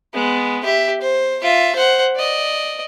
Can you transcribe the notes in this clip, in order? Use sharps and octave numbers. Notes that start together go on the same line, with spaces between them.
G#3 B3
G4 E5
C5
F4 E5
C5 F#5
D5 D#5